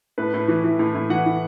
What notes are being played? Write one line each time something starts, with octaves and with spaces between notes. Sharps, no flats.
A2 B4
A2
E3
E3
A2
A2
E3 F#5
E3